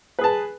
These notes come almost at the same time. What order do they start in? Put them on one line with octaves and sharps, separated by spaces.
B4 G#4 A5